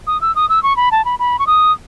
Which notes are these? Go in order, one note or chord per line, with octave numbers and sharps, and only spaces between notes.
D#6
E6
D#6
E6
C#6
B5
A5
B5
B5
C#6
D#6